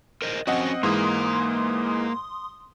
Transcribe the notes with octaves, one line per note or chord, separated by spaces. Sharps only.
A#4 C5 D#5
F3 C4 C#4 F#4 D#5 F#5
G#2 E3 G#3 A#3 C6 D#6